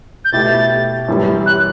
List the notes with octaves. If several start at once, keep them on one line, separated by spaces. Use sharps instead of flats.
G6
B2 A3 E4 G4 A6
F#2 E3 G3
F#6